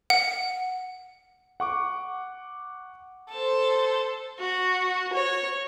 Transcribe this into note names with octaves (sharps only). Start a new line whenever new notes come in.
F#5
F#5 C#6 D6
A4 C5
F#4
C#5